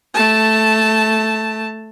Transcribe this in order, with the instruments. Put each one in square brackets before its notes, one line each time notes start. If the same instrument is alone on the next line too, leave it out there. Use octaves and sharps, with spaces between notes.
[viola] A3 A5